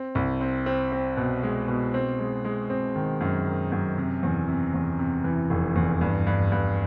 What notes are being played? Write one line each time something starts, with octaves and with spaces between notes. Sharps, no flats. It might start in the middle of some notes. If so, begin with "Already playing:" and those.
Already playing: C4
C2
C4
C4
C4
B2
G#3
B2
C4
G#3
G#3
C4
D#3
F#2
D#3
F#2
C3
E2
C3
E2
C3
E3
F1
E2
G2
G2
G2